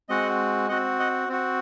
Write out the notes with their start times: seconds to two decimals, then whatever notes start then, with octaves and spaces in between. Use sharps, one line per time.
0.09 G#3 C4 F#4 D#5 F#5
0.69 C4 F#4 D#5 F#5
0.99 D#5 F#5
1.29 C4 F#4